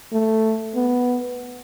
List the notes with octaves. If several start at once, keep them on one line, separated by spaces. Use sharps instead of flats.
A3
B3